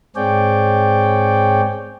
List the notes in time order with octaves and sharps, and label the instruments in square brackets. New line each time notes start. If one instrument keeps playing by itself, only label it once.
[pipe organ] G#2 C4 G#4 C#5 D5 G5